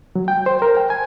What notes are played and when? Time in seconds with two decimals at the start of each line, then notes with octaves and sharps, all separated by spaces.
0.16 F#3
0.28 G5
0.46 C5
0.62 A#4
0.77 G5
0.90 G#5